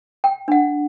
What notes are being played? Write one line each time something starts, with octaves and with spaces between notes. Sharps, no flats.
G5
D4 F#5